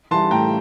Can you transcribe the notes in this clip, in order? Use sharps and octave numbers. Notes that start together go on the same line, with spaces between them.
E3 G3 A5 C6
A2 G5 A#5